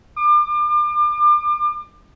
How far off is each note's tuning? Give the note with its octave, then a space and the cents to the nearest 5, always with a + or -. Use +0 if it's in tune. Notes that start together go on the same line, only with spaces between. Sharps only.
D6 +35